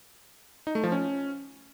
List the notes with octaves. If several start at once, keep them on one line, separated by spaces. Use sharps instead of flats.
D#4
A3
F3
C#4